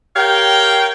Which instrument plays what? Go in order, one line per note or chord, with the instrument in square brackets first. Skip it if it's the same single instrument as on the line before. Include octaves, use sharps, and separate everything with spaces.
[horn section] G4 A#4 C#5 F5 G5